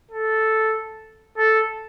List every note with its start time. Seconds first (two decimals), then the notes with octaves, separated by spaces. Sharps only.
0.11 A4
1.37 A4